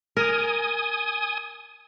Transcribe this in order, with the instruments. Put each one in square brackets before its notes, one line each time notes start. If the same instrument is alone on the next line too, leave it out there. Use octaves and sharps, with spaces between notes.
[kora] A#4 [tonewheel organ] G#5 D#6